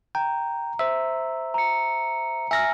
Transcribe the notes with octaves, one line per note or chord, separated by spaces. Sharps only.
G5 A#5
C5 E5
A#5 C#7
E5 G#5 E6 F6 A#6